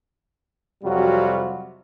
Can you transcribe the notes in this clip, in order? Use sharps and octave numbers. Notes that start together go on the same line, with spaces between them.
F2 C3 F#3 G3 F4 F#4